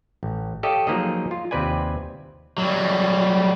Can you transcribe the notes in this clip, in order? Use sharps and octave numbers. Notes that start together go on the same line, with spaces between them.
A1
G4 A4 C#5 D#5 F5 G5
F3 F#3 A#3 D#4 G#4 D#5
F4
D#2 C3 C4 B4 D5 G#5
F#3 G3